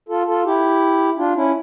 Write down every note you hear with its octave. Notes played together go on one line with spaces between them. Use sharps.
F4 A4
F4 A4
E4 G4
D4 F4
C#4 E4